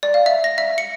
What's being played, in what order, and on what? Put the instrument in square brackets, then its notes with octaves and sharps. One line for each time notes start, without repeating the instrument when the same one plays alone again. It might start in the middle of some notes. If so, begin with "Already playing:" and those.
[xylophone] D5
F5
E5
A#6
E5
C#7